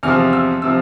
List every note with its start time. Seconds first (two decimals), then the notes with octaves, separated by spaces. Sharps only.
0.03 E2 C3 F3 F6
0.33 E6
0.62 C3 F3 E6